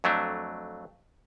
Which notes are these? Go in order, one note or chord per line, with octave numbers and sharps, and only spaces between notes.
F2 F#3 A3 D4